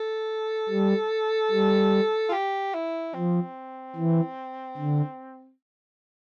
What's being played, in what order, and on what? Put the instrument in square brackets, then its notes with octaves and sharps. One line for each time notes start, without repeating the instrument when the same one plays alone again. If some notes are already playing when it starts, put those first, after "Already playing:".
Already playing: [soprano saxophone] A4
[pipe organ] G3
G3
[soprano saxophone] F4
G4
E4
[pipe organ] F3 [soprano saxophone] C4
[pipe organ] E3
D3